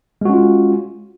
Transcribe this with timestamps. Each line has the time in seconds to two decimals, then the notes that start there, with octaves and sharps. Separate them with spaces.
0.21 G#3
0.25 F#4
0.29 C#4
0.33 F4